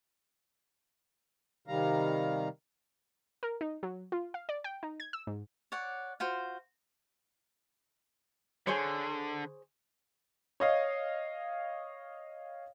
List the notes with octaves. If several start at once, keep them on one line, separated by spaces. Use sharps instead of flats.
C3 D#3 G3 F5 A#5
A#4
D#4
F#3
F4
F5
D5
G5
D#4
G#6
E6
G#2
C#5 D5 F#5
F4 F#4 C5
D3 G#4 C5 C#5
C#5 D#5 F5